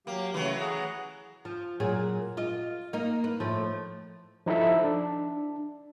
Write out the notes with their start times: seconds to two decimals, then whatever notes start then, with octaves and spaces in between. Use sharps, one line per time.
0.07 F#3 A#3 G4 F5
0.34 C#3 E3 F#3 A3
0.60 G#4 F#5 A#5
1.45 F3
1.80 A#2 F#3 G#4
2.37 F4 D#5
2.93 A#3 D#4
3.24 B4
3.40 A2 F3 A3
4.46 F3 D#4 E4 A4 E5
4.84 D4